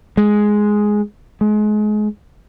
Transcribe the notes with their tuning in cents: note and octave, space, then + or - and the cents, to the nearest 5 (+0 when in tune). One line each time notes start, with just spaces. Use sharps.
G#3 +5
G#3 +30